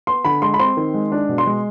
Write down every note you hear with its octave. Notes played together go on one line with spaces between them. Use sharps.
B3 C6
D3 B5
G#3 C6
B5
C4 C6
D#3
G#3
D4
B2
C6
G#3